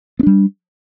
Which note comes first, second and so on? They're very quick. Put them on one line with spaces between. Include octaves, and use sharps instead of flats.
B3 D4 G3